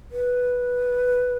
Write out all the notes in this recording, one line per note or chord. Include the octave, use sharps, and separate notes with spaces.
B4